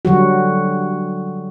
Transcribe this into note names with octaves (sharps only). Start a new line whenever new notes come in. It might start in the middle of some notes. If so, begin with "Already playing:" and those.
D3 F#3 G3 F#4